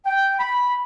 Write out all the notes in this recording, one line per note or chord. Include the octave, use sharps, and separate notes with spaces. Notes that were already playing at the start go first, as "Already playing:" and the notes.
G5
B5